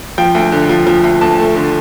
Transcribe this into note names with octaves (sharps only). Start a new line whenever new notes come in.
F3 G5
D2
D3
F3
F3
D2
D2 A5
A3
D3